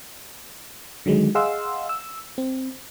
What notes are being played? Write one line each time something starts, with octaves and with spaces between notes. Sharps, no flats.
D3 D#3 F#3 G#3
G#4 D#5 F5 F#5 C6 E6
E6
C4